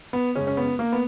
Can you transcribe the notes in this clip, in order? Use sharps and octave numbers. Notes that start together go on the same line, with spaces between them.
B3
F#2 C#3 G#3 C#4
C#4
B3
A#3
B3